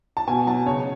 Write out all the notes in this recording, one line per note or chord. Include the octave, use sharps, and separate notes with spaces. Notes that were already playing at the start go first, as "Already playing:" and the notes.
A5
B2 G#5
F#3 A5
C#3 C#5